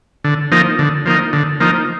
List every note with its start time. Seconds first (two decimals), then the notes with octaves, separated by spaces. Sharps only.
0.24 D3
0.52 F3 A#3 D#4
0.79 D3
1.06 F3 A#3 D#4
1.33 D3
1.60 F3 A#3 D#4